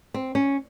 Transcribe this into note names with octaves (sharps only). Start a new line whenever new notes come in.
C4
C#4